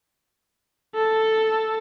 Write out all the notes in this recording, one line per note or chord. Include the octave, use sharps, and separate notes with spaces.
A4